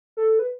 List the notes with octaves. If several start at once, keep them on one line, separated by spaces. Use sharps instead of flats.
A4
B4